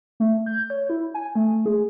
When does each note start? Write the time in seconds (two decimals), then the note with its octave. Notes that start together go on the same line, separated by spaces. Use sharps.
0.20 A3
0.46 G6
0.70 C#5
0.90 E4
1.14 G#5
1.35 A3
1.66 G#4